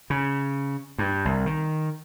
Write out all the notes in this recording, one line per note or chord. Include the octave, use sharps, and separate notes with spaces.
C#3
G2
C2
D#3